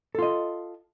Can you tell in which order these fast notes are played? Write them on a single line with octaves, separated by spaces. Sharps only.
A4 F4 D#5